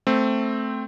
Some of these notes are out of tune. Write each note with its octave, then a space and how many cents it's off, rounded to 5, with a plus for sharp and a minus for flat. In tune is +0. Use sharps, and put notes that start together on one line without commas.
A3 +0 C4 -5